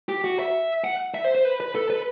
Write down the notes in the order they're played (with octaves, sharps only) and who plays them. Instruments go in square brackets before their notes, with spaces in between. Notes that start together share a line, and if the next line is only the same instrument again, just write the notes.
[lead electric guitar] G4
F#4
E5
F#5
E5
C5
C5
B4
B4
A4
B4